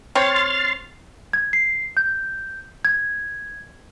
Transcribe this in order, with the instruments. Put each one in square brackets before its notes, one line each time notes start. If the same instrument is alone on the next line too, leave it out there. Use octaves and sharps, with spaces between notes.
[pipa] C4 C#5 [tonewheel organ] C6 F6 A6
[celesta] G#6
C7
G6
G#6